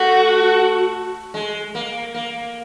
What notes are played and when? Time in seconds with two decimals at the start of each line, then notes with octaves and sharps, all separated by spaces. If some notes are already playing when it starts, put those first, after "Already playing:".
Already playing: A3 F#4
1.34 G#3
1.75 A#3
2.14 A#3